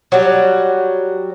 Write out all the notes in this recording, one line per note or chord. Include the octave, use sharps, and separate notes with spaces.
F#3 G3